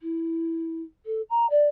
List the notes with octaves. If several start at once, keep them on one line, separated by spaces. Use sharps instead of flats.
E4
A4
A#5
D5